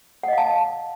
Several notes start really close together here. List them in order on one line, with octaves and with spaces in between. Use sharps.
F#5 D#5 F5 A5